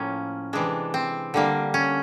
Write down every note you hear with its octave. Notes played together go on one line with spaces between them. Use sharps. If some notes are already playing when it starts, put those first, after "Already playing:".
Already playing: A2 F3 A#3 C#4
C3 E3 G#3 D4
C4
D3 G3 A#3
C#4